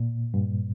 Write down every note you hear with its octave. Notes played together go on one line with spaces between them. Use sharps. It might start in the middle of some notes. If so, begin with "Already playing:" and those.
Already playing: A#2
G2